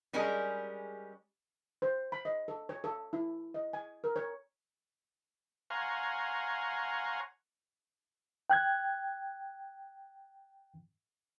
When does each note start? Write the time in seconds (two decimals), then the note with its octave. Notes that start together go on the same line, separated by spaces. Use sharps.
0.13 G3 G#3 C#4 G#4 A#4
1.82 C5
2.12 B5
2.25 D#5
2.48 A4
2.69 C#5
2.84 A4
3.13 E4
3.54 D#5
3.73 G#5
4.04 A#4
4.16 C#5
5.70 C#5 F5 F#5 G#5 A#5 C6
8.50 G5 F#6 G#6